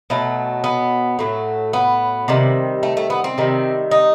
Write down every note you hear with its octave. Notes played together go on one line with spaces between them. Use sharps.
B2 F#3 A3
B3
A2 F#3 A3
B3
C3 D#3 G3
A3
A3
B3
C4
C3 D#3 G3
D#4